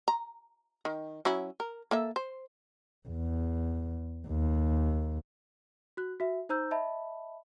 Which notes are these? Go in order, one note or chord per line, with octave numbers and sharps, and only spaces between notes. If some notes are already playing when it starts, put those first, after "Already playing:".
A#5
D#3
F#3 C#4 E4
A#4
A#3 A4 E5
C5
E2
D#2
F#4 F#6
F#4 E5
D#4 C5 A#5 E6 G6
D#5 E5 A5 B5